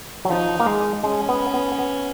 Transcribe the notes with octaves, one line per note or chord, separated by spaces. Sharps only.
F#3
F3 D#4
A#3
G#3
G#3 C#4
B3
B3
B3